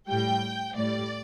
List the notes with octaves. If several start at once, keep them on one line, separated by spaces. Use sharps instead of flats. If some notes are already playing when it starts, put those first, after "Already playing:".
A2 G3 G5
A2 G3 D5